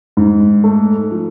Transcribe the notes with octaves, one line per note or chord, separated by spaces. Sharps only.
G#2
A3
F3